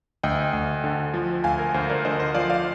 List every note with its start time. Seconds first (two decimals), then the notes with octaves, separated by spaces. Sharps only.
0.23 D2 D#5 G5
0.53 D2
0.84 D3
1.14 F3
1.44 D2 F5 G#5
1.59 A#4
1.74 D2 C5
1.89 A#4 D5
2.05 D3 C5 D#5
2.20 C5
2.34 F3 D5 F5
2.50 D5 F5